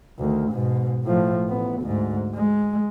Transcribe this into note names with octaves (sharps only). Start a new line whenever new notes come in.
D2 D#3
G#2 B2
A2 F3
A1 B3
D2 G#2
G#3